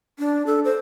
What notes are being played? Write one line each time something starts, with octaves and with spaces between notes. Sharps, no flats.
D4
A4
C5